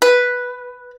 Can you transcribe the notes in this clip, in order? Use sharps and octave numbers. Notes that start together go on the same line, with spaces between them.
B4